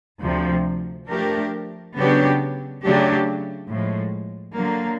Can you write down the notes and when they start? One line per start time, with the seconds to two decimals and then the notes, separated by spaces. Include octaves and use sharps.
0.22 D2 C3 F3
1.08 F3 A3 D4 G4 A#4
1.96 C#3 F#3 B3 D4 G4
2.83 C#3 F#3 A3 D4 G4
3.69 A2 F3 G#3
4.56 D3 F#3 A#3